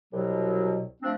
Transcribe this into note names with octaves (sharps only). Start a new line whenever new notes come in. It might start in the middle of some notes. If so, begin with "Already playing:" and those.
C2 B2 F#3
F3 A3 C4 D4